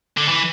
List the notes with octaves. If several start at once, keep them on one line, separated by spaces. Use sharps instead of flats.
D3
E3